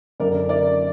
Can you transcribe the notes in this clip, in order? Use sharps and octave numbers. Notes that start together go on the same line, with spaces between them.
F#2 D3 A#4 D5
A#4 D5